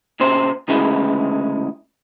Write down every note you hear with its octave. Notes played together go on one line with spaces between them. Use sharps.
A#2 C#3 C5
D2 C#3 E3 G#3 E4